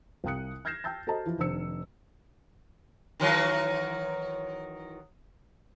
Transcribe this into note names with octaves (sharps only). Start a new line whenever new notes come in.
C2 F5 G5 D#6 F#6 C#7
F6 G6 G#6 A#6 C7 E7
G5 A5 E6 G6 A6
F#4 A4 C5 D#5 A5 A#5
E3 F3
F1 D#3 D4 C5 E6 C#7
D#3 E3 F#3